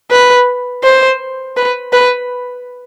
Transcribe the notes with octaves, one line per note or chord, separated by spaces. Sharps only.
B4
C5
B4
B4